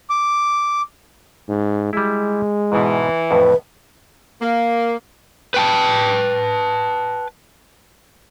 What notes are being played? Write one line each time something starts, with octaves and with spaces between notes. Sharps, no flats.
D6
G#2
G3 G#3 E4
G#2 B2 E3
F2 A2 B4
A#3
B4 G5 A5